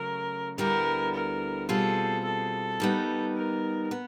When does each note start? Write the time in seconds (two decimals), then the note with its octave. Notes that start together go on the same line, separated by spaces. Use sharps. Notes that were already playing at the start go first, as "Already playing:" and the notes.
Already playing: C#3 F#3 A3 A#4
0.58 D2 D3 G3 B3 E4 A#4
1.14 A#4
1.69 B2 G3 C4 F4 G#4 A4
2.25 A4
2.80 D#3 G3 B3 D#4
3.36 A#4
3.91 B3